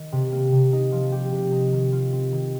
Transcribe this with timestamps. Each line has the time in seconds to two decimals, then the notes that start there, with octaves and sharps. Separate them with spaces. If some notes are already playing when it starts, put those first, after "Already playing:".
Already playing: D#3
0.12 C3
0.32 A#3
0.52 C3
0.73 D#4
0.92 F3
1.12 G4
1.33 C3
1.52 D#4
1.73 D#3
1.92 F4
2.13 C4
2.33 D#3